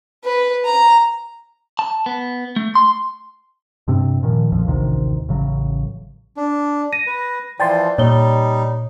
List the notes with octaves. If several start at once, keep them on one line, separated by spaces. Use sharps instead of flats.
B4
A#5
A5
B3
A3
C6
G2 C3 C4
A#2 D#3 F3
B1 F2 A#2 F3
A1 D2 C3 D#3
A1 C#3 F#3
D4
A#6 D#7
B4
E3 F3 D5 G5 A5 C6 A6
A#2 G3 D#4 C#5 G7